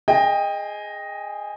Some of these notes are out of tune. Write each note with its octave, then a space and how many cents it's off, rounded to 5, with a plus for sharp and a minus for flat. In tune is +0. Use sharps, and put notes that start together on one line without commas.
G#4 +0 D#5 +0 G5 +25